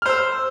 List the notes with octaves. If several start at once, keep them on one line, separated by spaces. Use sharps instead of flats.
C5 E6 F6